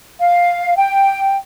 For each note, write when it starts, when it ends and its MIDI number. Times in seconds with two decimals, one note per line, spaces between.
0.20 0.77 77
0.78 1.36 79